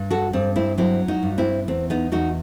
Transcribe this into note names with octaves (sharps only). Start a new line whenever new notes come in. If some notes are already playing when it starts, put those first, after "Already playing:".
Already playing: G2
F#4 A4
G2 C4
C4 E4
F#3 C4 E4
D#4 F#4
G2
C4 E4
E2 C4
B3 D#4
E2 D#4 F#4